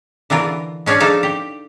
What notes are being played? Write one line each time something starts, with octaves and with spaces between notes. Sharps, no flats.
D3 E3 F4 A#4
G#3 C#4 D4 G#4
F3 D4 D#4 A4 F5
G4